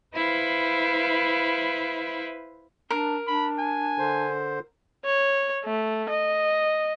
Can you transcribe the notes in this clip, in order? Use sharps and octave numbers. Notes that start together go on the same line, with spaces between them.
E4 B4 C5 E5 F5
D4 A#4
D4 B5
G#5
D3 C5
C#5
A3
D#5